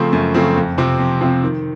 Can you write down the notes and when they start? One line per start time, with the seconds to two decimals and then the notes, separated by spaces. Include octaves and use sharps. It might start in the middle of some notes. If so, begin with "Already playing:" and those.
Already playing: C#3 F3 A3 C4
0.13 F#2
0.34 C#3 F3 A3 C4
0.56 F2
0.78 C3 F3 C4
0.99 F2
1.21 C3 F3 C4
1.43 D#3